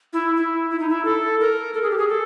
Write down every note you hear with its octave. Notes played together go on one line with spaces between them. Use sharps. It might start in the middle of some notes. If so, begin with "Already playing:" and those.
E4
E4
E4
D#4
E4
A4
A#4
A4
G#4
G4
G#4
A4